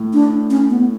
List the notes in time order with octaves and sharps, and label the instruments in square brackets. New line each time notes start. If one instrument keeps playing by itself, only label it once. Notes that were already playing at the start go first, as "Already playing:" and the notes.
Already playing: [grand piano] A2
[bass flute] D4
C#4
B3